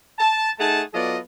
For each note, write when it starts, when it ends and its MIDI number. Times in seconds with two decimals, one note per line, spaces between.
0.19 0.50 81
0.59 0.82 57
0.59 0.82 63
0.59 0.82 68
0.59 0.82 78
0.59 0.82 81
0.94 1.18 54
0.94 1.18 59
0.94 1.18 65
0.94 1.18 69
0.94 1.18 74
0.94 1.18 75